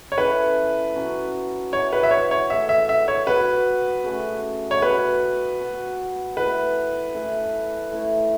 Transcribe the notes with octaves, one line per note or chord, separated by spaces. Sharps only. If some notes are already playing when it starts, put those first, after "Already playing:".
C#5
E3 C#4 A4 B4
B2 F#3 C#4
E3 B3 F#4 C#5
B4
E5
C#5
C#5
A2 E3 B3 A4 E5
E5
E5
C#5
B2 B3 F#4 B4
C#3 A3 C#4 F#4
C#5
B2 B3 F#4 B4
B2 B3 F#4
E3 A3 E4 A4 B4
E3 A3 E4 A4
A2 A3 E4